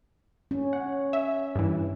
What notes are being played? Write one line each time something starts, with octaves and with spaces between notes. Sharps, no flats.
C#4
F#5
E5
G2 E3